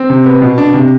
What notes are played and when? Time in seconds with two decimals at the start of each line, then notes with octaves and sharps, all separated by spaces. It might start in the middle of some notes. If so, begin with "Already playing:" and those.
Already playing: C4
0.10 C3
0.26 B3
0.42 B2
0.58 D4
0.74 C3